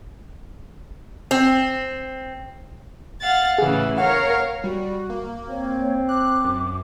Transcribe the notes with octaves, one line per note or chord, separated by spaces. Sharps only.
C4
F5 F#5 A6
A2 C#3 E3 G#4
A#4 C#5 F5 F#5
G3 F#4
A#3
C4 C#5
D6 F#6
F#2